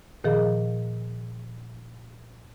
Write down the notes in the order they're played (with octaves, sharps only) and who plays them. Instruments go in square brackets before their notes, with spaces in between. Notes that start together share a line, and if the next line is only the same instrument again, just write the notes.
[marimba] A#2 D#3 F3 G#4